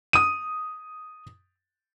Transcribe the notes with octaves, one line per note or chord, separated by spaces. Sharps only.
D#6 D#7